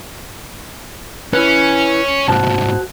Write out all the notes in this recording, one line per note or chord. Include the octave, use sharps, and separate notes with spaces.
C#4 E4 B4
C2 G#2 F#4 C5 A5